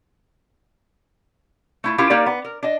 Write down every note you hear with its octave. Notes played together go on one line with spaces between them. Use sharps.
A3 E4 F4
C#4 E4 F4 G4 A#4
A#3 D#4 G4 A#4 D5
B3
A#4
D4 D#5